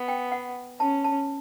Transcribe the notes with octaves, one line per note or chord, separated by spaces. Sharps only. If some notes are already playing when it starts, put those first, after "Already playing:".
Already playing: B3
G5
F#5
C#4 A5
A5